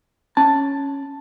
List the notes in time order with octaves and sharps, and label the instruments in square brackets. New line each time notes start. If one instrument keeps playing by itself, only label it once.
[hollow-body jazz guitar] C#4 A5